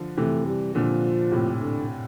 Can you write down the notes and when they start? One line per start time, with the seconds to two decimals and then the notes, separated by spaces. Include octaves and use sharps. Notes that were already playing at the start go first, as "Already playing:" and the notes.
Already playing: D3 F3
0.17 C3 E3 A3
0.47 G3
0.75 A#2 D3 F3
1.31 A2 C3
1.60 D3